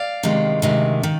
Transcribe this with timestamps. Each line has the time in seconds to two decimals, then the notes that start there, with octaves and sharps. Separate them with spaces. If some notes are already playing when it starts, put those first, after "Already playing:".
Already playing: D5 F5
0.23 D2 C3 D#3 G#3
0.62 D2 C3 D#3 G#3
1.03 D#3